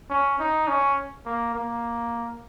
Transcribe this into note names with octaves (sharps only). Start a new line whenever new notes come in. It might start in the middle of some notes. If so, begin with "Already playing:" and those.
C#4
D#4
C#4
A#3
A#3